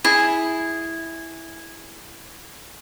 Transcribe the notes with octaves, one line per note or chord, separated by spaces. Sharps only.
E4 G#4